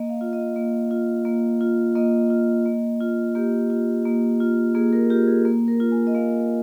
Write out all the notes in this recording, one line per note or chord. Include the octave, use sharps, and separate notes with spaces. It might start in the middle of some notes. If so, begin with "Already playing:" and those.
Already playing: A#3 D#5
F5
F4
D#5
A#3
F4
A#3
F4
A#3 D#5
F4
A#3
F4
A#3 G4
F4
A#3
F4
A#3 G#4
A#4
F4 G4
G#4
A#3
A#4
F4
G#5
D#5
A#3 F5